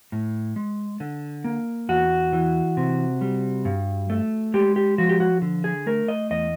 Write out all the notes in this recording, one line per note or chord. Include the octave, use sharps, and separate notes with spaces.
A2
G#3
D3
A#3
E2 F#4
E3
C3
G3
G2
A3
G#3 G4
G4
F3 F#4
G4
F#4
D3
G#4
A3 A#4
D#5
E2 D#5